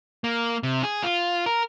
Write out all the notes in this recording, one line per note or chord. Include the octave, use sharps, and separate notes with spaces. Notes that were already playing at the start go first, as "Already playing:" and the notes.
A#3
C3
G#4
F4
A#4